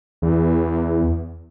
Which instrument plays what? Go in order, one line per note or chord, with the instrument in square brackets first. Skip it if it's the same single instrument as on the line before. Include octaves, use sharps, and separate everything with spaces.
[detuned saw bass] E2